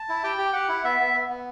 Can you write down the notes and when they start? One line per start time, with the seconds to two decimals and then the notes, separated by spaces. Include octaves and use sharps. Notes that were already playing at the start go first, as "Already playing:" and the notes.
Already playing: A5
0.09 E4
0.24 G4 G5
0.38 G4
0.53 G4 F#5
0.69 E4
0.84 B3 E5
1.00 B3
1.14 B3
1.29 B3